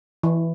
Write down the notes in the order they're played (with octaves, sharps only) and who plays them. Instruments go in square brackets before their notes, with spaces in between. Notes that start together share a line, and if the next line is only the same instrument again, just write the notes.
[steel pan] E3